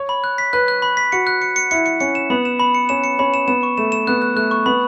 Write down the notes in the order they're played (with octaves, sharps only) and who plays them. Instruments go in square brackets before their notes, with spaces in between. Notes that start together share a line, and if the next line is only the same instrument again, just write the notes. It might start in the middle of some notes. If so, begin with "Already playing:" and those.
Already playing: [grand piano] C#5
[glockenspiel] B5
F#6
B6
[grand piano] B4 [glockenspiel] F#6
[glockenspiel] F#6
B5
B6
[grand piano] F#4 [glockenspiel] C#7
[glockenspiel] F#6
C#7
C#7
[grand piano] E4 [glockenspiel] C#7
[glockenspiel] C#7
[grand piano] C#4 [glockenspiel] C#7
[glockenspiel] E7
[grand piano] B3 [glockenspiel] B5
[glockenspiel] E7
B5
C#7
[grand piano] C#4 [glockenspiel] E7
[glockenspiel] C#7
[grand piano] C#4 [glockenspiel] B5
[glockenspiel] E7
[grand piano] B3 [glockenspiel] E7
[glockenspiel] C#6
[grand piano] A3 [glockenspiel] E7
[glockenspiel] E7
[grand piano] B3 [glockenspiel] F#6
[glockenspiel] F#6
[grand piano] A3 [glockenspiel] F#6
[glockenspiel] C#6
[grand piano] B3 [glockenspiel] B5